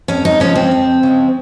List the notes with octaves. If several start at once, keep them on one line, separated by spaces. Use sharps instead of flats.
F2 C#4
D#4
C#3 F3 G#3 C#4
C4
F2
C#3 F3 G#3